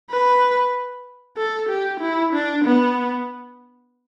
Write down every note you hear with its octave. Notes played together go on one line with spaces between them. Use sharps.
B4
A4
G4
E4
D4
B3